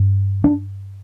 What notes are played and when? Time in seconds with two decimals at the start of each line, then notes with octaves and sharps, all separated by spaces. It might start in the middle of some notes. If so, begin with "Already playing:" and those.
Already playing: G2
0.44 D4